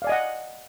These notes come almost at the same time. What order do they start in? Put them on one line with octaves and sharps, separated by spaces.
F5 D5 G#5 D#5 F#5